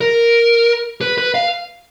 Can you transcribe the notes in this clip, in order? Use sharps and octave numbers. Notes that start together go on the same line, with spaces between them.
A#4
B4
B4
F5